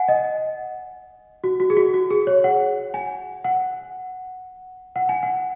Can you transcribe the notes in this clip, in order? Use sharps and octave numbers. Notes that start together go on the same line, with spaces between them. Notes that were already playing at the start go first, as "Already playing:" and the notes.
Already playing: F#5 G#5
D#5
F#4
F#4
G#4
F#4
F#4
G#4
C#5
F#5
G#5
F#5
F#5
G#5
F#5